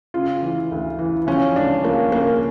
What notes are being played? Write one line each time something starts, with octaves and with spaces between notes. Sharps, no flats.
C#3 F4
E3
D2
E3
F3 C#4
C#2 D4
F3 A#3
C#3 A#3